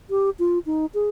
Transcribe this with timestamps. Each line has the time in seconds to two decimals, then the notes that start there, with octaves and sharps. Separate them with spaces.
0.10 G4
0.39 F4
0.66 D#4
0.94 G#4